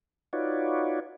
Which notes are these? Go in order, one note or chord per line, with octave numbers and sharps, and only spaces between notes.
D#4 F4 F#4 B4 C#5 D5